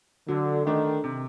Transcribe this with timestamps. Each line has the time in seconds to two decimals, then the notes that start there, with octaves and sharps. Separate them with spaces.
0.28 D3 F#3
0.66 D#3 A3 D4
1.04 C3